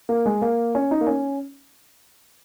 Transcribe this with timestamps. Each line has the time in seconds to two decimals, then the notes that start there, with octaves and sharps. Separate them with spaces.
0.09 A#3
0.26 G#3
0.42 A#3
0.75 C#4
0.91 D#4
1.01 A#3
1.07 C#4